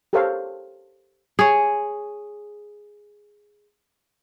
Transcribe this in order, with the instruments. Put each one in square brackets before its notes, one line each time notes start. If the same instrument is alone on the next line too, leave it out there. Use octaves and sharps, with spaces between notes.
[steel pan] G4 A4 A#4 C5 C#5 F5
[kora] G#4 C#5